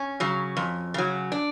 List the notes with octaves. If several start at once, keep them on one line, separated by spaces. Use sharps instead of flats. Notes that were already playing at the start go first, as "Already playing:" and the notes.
Already playing: C#4
C#3 F#3
F2
C#3 F#3
D4